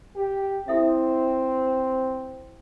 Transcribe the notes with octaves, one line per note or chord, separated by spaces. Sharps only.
G4
C4 E4 A4 E5